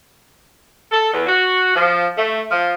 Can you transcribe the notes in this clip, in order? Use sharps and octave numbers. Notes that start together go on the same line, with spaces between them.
A4
E2
F#4
F3
A3
F3